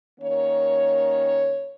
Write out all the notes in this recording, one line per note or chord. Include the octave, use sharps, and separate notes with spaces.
D#3 A#3 C#4 C#5